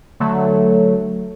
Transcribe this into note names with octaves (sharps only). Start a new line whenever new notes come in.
D3 F#3 A3